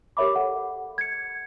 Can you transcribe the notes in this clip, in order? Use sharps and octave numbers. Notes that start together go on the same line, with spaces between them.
G4 A#4 C#5 E5 B5 D6
A4 F#5
G#6 C#7